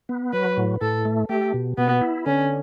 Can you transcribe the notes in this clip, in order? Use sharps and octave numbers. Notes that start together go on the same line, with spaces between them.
B3
F#3 B4
A2
A2 A4
A3
A3 G4
B2
B2 B3
E4
D3 C#4